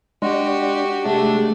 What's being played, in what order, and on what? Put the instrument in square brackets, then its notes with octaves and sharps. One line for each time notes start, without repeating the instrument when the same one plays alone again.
[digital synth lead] G#3 [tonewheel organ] D4 [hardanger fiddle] F#4 G4
[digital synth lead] C3 [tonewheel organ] G#3 [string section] A3 D4